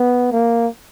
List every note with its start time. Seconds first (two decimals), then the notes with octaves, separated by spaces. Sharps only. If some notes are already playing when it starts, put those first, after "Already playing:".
Already playing: B3
0.32 A#3